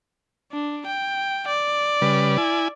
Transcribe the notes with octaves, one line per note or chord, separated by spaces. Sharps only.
D4
G5
D5
C#3 G3 B4
E4 G#5